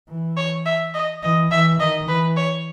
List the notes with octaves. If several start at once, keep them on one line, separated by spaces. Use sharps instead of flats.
E3
C#5
E5
D#5
E3 D#5
E3 E5
D#3 D#5
E3 B4
C#5